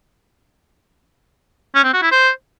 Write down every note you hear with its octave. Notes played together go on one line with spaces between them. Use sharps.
C#4
C4
F#4
E4
C5